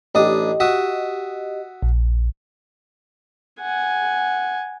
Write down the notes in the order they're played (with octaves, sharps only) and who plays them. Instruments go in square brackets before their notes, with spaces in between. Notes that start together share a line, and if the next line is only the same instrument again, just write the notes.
[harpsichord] A1 D4 D#6 [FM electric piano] G4 D#5
[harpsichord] F#4 E5 D#6
[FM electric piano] A#1
[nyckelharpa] F#5 G#5